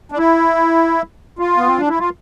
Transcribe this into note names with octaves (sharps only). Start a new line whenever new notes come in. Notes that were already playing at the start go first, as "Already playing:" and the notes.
D4
E4
F4
B3
C4
D4
E4
F4